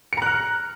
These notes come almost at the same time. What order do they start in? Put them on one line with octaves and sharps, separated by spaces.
C#7 A#5 F#6 F6